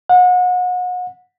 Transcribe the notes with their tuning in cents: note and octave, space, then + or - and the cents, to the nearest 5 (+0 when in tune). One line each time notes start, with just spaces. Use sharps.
F#5 -35